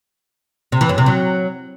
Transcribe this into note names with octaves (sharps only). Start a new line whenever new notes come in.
C3
E3
F#2
C3
F#3